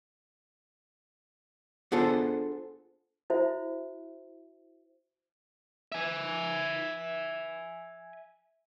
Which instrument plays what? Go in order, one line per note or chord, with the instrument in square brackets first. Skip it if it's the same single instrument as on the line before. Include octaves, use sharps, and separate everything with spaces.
[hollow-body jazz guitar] B3 D4 F4 G#4 A4 C5
[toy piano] E4 F#4 C5 E5
[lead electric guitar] E5 G#5